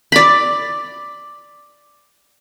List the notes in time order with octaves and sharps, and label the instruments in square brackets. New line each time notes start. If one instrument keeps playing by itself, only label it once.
[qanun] D5 B5